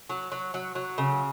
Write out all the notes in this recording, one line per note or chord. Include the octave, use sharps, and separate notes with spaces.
F#3
F#3
F#3
F#3
C#3